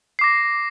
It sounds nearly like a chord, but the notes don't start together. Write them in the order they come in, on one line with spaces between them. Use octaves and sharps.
C7 D6 A#6